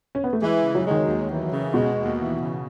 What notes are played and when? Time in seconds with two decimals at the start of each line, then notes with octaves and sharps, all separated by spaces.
0.15 C#4
0.24 B3
0.33 A3
0.42 E3 G#3
0.64 C#3
0.75 F#3
0.86 D#3 G#3
1.08 D#2
1.30 E3
1.51 C#3
1.74 B2 G#3
1.96 D#2
2.18 E3
2.40 C#3